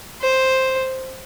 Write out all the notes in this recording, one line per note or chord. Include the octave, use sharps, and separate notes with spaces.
C5